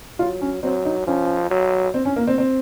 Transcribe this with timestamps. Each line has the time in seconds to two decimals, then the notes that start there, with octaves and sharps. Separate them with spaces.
0.19 F#3 F4
0.41 C#4
0.63 F#3 C4
0.85 D#4
1.07 F3 C#4
1.51 F#3
1.94 C4
2.05 C#4
2.16 A#3
2.27 C4
2.38 C4